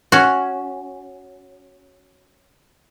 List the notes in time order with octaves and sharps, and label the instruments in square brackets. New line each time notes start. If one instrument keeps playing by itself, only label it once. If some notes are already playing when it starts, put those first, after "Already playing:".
[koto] C#4 F#4